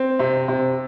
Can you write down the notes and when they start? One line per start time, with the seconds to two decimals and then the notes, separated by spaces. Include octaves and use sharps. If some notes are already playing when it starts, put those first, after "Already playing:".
Already playing: C4
0.19 C3
0.48 C3